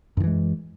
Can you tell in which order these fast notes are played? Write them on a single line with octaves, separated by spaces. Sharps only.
F#2 D#3 E3 G#3